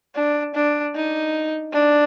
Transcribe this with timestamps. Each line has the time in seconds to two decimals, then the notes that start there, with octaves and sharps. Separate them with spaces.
0.15 D4
0.55 D4
0.95 D#4
1.73 D4